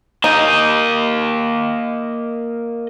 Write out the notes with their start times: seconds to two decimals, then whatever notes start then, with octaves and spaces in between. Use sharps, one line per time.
0.24 A#3 D#4 D#5